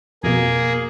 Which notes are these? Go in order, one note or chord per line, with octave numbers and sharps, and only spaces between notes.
F2 B2 A#3 G#4